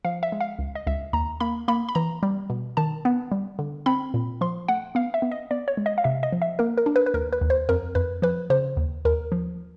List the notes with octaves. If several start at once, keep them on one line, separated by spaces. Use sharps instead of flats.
F3 F5
E5
G#3
F5
C#2
D#5
C#2 E5
D#2 A#5
A#3 B5
A#3 B5
B5
E3 A#5
G3
B2
D#3 A5
B3
G3
D3
C4 B5
A#2
F3 C6
A3 F#5
B3 F5
E5
B3
D#5
B3 D5
C#5
G#3
D#5
F5
C3 E5
D#5
F3
E5
A#3 A#4
A#4
D4
B4
B4
D#2 A#4
B4
D#2
C5
F2 A#4
F2 B4
F3 B4
C#3 C5
D#2
D#2 A#4
F3